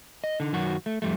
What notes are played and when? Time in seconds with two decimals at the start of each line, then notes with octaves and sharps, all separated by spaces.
0.24 D#5
0.40 D3 D#4
0.53 F#2 D#3 F#3 F#4
0.86 A3
1.02 F2 G3 A3